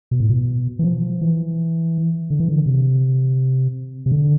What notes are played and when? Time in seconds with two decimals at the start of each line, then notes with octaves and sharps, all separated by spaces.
0.11 B2
0.20 A2
0.29 B2
0.79 E3
0.84 F3
1.21 E3
2.30 D3
2.40 E3
2.48 D3
2.66 C3
4.06 C3
4.12 D3